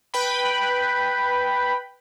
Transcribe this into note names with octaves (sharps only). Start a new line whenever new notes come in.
B4 G5 B5